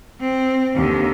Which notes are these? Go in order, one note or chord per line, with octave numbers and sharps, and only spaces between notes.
C4
D#2 D3